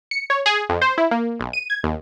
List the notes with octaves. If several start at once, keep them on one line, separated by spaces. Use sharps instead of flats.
C#7
C#5
G#4
F2
C5
E4
A#3
B1
D#7
G#6
D#2